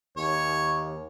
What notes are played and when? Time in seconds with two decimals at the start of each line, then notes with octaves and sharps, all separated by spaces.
0.17 D#2 C#5